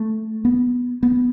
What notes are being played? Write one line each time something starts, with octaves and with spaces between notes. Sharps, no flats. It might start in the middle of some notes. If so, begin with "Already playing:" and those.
Already playing: A3
B3
B3